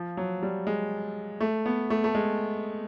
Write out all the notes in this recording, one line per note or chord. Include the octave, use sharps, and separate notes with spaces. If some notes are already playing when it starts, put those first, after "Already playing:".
Already playing: F3
F#3
G3
G#3
A3
B3
A3
A3
G#3